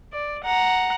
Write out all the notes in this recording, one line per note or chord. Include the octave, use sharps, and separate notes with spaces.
D5
F#5 A#5